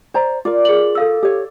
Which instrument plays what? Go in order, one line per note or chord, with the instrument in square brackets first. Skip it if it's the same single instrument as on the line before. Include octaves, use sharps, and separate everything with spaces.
[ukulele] C5 D5 A#5
[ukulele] F4 A#4 [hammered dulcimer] D5
[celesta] G#4 F#7
A4 F5 E6
[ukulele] G4 C#5